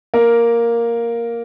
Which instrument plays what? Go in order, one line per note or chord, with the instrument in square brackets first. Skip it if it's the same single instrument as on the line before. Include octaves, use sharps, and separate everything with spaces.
[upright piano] A#3 A#4